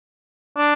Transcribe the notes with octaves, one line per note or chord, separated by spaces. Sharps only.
D4